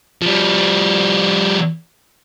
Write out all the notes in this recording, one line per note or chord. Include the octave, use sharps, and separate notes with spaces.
F3 G3